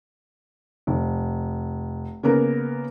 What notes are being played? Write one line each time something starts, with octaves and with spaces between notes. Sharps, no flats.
F1
C#3 A#3 B3 A#4